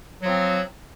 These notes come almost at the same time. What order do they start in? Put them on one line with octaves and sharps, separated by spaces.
F#3 F3 C4